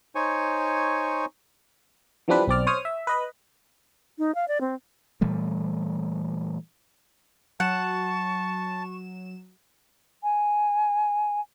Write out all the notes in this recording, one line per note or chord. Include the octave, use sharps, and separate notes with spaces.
D#4 C5 C#5 G#5 C#6
E3 F3 G3 C4 D4 B4
B1 C4 D5 F6
C5 C#5 D#6 F6
E5
B4 D#5 B5
D#4
F5
D5
C4
A#2 E3 G3 A3
F#3 F#5 A5 C#6 E7
G#5